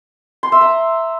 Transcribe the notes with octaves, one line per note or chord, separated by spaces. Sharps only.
C6
E5
A#5